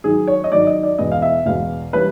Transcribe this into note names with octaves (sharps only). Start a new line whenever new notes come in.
G#2 D#3 F#3 G#4
C#5
D#5
G#2 D#3 F#3 D5
D#5
D5
E2 B2 G#3 B3 D#5
F5
E5
E2 B2 G#3 B3 F5
E3 G3 A#3 C#4 B4